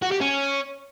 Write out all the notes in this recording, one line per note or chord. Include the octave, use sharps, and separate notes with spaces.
F#4
G4
C#4